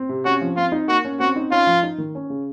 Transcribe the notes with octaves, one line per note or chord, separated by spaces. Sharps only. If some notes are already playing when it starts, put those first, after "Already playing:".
Already playing: C4
C3
C#4 F#4
F3
C4 F4
D#4
A#3 F#4
C#4
C4 F#4
D#4
C#4 F4
F3
D#4
D#3
C#4
C#3